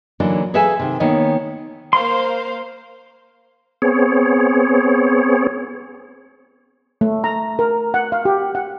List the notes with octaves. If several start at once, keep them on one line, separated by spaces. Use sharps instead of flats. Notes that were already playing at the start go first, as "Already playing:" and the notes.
D3 E3 F#3 A#3 D4 D#4
G#4 A4 B4 E5 F5 G#5
C3 D#3
D#3 A#3 B3 C#5 D#5
A#3 C5 F5 C6
B3 C4 G#4 C#5
A3
A#5
A#4
F#5
F5
G4
F#5